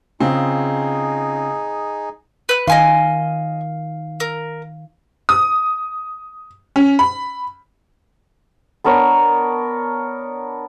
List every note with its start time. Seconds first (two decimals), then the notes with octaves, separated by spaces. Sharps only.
0.20 C#3 C4 D#4 F4 G#4
2.49 B4 F#6
2.67 D#3 D#5 F5 G#5 C6
4.20 A#4
5.29 D#6
6.76 C#4
6.99 B5
8.84 B3 D4 A#4 C#5